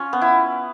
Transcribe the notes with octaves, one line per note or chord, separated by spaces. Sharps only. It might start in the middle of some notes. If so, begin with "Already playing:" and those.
Already playing: C#4 F4
B3
E4